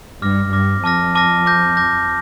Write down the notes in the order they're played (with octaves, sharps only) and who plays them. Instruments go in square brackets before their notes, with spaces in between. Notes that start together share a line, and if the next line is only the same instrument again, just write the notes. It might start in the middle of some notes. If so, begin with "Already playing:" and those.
[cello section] G2 [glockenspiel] D6 F6 A#6
[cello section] G2 [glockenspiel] D6 F6 A#6
[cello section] F2 [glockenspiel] A5 D6 F6 A#6
[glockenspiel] A5 D6 F6 A#6
D6 G6 A#6
D6 G6 A#6